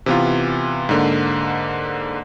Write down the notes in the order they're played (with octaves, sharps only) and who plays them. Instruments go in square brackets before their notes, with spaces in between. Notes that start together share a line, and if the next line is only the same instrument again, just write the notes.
[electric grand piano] C3 E3 B3 F4
G#2 D3 A#3